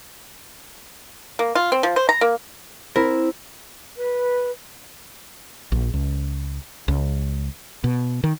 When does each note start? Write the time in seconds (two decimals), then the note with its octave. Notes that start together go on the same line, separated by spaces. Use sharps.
1.39 A#3
1.55 F4
1.72 C4
1.83 F3
1.96 C5
2.09 A#5
2.21 A#3
2.96 C4 E4 A#4
3.97 B4
5.72 A#1
5.94 C#2
6.88 C#2
7.84 B2
8.24 D#3